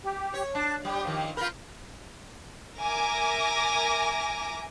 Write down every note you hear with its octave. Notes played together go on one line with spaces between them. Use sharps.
G4
C#5
D4 A5
G3 G4
D#3 F3
F4 A#4 B5 G6
A#4 E5 G#5 D6 A#6